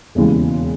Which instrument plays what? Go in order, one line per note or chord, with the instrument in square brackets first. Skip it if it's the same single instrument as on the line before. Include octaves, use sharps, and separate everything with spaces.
[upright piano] E1 D#2 C#3 E3 G#3